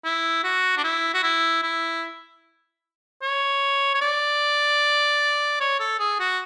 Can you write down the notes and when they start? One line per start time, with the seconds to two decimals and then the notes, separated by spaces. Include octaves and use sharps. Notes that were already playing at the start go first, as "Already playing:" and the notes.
0.04 E4
0.44 F#4
0.77 D4
0.84 E4
1.14 F#4
1.23 E4
1.63 E4
3.22 C#5
3.95 C#5
4.01 D5
5.60 C#5
5.80 A4
5.99 G#4
6.20 F#4